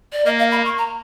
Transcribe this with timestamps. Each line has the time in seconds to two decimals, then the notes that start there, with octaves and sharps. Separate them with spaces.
0.13 D5
0.25 A#3 D#5
0.38 F5
0.51 B5
0.65 C#6
0.78 A#5